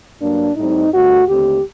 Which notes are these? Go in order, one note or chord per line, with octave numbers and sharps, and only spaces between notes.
G2 F#3 A#3 D4
A2 G3 C4 D#4
G2 D3 A3 F#4
D#2 D3 A3 C4 G4